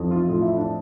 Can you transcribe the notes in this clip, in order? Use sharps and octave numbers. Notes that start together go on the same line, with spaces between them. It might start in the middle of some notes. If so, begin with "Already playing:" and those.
Already playing: F2 E3
F4
A2 F4
E4
D4